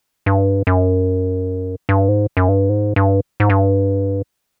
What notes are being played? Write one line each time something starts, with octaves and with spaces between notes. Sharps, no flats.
G2
F#2
G2
G#2
F#2
G2
G#2
G2
G#2
G2